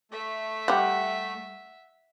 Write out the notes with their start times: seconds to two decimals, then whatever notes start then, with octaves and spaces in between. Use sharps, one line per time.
0.12 A3 E5
0.68 G3 G4 F#5